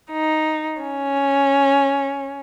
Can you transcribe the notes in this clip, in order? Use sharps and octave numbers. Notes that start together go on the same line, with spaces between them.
D#4
C#4